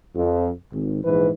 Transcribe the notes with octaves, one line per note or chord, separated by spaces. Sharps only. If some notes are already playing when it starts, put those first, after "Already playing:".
F2
G#1
A#1 G#2 E3 B4